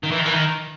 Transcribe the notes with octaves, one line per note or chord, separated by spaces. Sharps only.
D#3
E3
D#3
E3
D#3